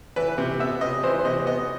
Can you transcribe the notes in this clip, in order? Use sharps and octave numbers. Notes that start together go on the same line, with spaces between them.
E3 B4
C3
B3 E5
C3 D#5
E3 C5
C5
C3 D#5
B3 D#5